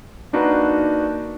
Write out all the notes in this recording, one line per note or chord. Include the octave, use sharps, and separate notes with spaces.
A#3 D4 D#4 F#4 A#4 B4